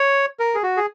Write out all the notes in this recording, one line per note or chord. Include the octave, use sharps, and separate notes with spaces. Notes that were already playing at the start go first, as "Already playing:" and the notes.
Already playing: C#5
A#4
G#4
F#4
G#4